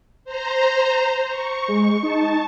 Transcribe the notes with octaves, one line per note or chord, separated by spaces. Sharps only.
C5 A#5
C#6
G#3
D#4 A5